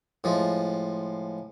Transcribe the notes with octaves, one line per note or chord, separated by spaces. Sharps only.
A2 F3 G#3